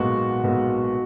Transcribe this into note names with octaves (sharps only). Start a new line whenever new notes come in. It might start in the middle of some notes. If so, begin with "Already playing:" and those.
Already playing: B1 A#2 G#3 B3 F#4
B1 A#2 G#3 B3